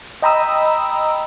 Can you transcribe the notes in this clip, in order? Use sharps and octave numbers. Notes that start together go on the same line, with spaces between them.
D#5 G5 A#5 B5 D#6 E6